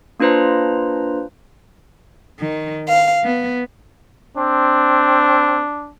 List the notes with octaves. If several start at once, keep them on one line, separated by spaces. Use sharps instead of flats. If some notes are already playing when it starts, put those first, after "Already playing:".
A#3 D4 F4 B4 C5 A#5
D#3
F5
B3
C4 D4